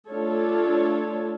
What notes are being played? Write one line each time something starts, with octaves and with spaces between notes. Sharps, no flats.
A3 D4 F4 A4 C#5